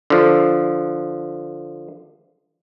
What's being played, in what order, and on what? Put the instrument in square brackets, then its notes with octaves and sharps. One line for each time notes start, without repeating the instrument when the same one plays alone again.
[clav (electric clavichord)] D3 F3